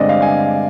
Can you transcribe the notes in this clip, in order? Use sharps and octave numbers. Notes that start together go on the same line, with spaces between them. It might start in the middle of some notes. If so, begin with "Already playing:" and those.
Already playing: G2 D3 G#3 C4 D5 D#5
F5
G#5